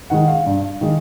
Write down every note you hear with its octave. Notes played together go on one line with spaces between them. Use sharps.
D#3 G#3 F#5
F5
G2
D#3 G#3